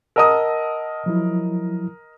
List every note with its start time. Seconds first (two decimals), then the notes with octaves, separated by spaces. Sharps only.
0.16 A#4 D#5 F#5 A5 D#6 E6
1.06 F3 F#3 E4